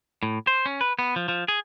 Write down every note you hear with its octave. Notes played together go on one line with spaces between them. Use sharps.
A2
C5
C#4
B4
B3
F3
F3
G#4